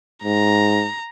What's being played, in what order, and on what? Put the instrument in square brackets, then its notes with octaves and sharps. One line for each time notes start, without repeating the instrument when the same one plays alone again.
[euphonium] G#2 [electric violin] A#5